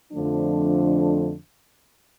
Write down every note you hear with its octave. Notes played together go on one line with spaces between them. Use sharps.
F2 D3 F3 A3 D4